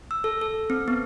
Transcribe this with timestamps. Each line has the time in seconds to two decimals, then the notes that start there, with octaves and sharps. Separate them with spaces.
0.11 E6
0.24 A4
0.41 A4
0.70 C4
0.88 B3